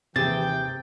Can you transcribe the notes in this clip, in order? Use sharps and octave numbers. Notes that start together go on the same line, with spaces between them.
D#2 C3 E3 G#4 G5 A6